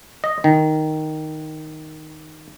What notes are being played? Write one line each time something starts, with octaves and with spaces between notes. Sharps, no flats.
D#5
D#3